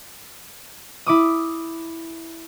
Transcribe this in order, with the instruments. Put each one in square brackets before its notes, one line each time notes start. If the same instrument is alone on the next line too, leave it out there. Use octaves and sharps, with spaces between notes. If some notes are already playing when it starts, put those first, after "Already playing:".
[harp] E4 D6 D#6